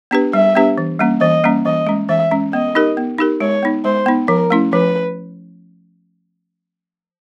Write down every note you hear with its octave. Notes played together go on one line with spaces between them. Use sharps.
B3 D4 G4 B4
G3 E5
B3 D4 G4 B4
E3
G3 A#3 C#4
E3 D#5
G3 A#3 C#4
E3 D#5
G#3 C#4
E3 E5
G#3 C#4
B3 D#5
D#4 G4 A#4
B3
D#4 G4 A#4
G#3 C#5
B3 D#4
G#3 C5
B3 D#4
F3 A#4
A3 C#4 E4
F3 B4